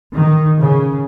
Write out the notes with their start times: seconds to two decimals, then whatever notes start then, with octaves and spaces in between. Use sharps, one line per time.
0.13 D#3
0.62 C#3